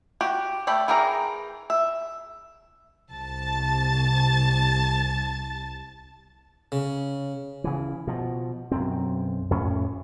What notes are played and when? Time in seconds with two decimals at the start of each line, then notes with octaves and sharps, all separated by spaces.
0.21 F#4 G4
0.67 A3 D5 G5 A5 B5
0.88 E3 G#4 A#4 G5 A#5
1.70 E5
3.12 C2 A5 A6
6.72 C#3
7.64 C#3 E3
8.07 B2 F3
8.71 B1 F#2 C4
9.51 F2 A2 C#4